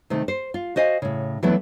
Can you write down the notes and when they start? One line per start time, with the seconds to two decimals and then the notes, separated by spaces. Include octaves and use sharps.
0.10 C3 D#3 A3
0.28 C5
0.54 F4
0.76 F#4 C5 D#5 F5 G#5
1.02 A2 C#3
1.43 E3 F#3 A3 B3 D4 E4